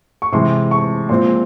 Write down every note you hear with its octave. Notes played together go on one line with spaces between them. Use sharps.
C#6
C3 E3 G#3 C6
C#6
A#2 F3 G#3 C4 C6